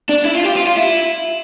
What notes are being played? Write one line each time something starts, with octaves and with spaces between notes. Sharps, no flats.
D4
E4
F4
G4
F4
F4
E4